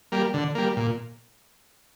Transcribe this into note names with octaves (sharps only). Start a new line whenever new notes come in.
G3 A#3
D3
G3 A#3
A#2